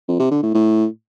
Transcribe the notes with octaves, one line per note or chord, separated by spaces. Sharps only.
F2
C3
D3
A2
A2